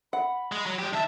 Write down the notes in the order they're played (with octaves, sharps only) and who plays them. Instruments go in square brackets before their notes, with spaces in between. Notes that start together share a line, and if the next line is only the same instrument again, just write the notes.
[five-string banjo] F#5 [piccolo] B5
[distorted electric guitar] G#3
F#3
G#3 G4
[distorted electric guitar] D#3 E5 [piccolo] A5